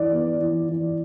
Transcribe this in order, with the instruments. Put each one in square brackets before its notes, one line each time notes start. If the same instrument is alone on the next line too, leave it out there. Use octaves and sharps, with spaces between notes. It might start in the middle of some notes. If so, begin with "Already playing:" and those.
Already playing: [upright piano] E3 D5
B3
E3
E3